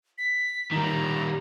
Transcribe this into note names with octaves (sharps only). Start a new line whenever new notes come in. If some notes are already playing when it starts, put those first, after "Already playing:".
B6
D#3 G3 A#5